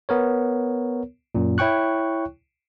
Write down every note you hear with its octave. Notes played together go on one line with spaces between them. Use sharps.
B3 A#4 C#5
F#2 A#2
E4 C#5 G5 C#6 F#6